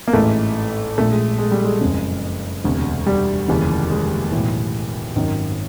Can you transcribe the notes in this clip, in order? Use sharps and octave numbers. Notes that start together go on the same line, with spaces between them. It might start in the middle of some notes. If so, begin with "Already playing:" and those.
A#3
A1 G#2 E3 A3
A#1 A#2 A3
G#3
G#3
G3
G#3
F#1 F2 C#3
E1 D2 C3
G3
F1 D#2 C#3 E3
G#3
B1 A2 E3
G#1 F#2 D#3